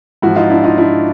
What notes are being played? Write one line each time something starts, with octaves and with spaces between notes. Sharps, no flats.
G#2 F3 E4 F#4
D#4 F4
D4 E4
D#4 F4
D4 E4